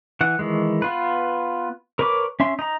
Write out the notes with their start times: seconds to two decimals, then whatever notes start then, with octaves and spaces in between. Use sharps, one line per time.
0.21 E3 F#5
0.39 D#3 E3 G#3
0.82 B3 F4 B4
1.99 A#4 B4 C#5 B5 D6
2.40 C#4 E5 C6
2.59 D#4 A#5